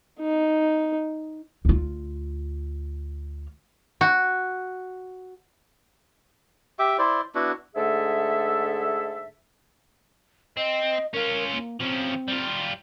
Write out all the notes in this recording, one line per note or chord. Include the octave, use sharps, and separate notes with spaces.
D#4
D2 F4
F#4
G4 E5 D6
E4 C5 D5
B3 D4 E4 F#4
G#2 D3 A3 G#4 A4 E5
C4 D#5
C#4 F4 A#4
A#3
F3 C4 C#4
G3 F4